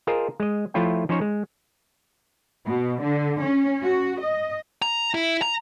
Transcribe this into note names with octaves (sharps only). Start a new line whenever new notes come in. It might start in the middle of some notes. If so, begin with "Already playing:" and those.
F4 G#4 A#4 C5 D#5
G#3 D#5
F3 A3 E4 F4 C#5 G5
F3 C#4 D#4 C5 C#5
G#3
B2
D3
C#4
F#4
D#5
A#5
E4
A#5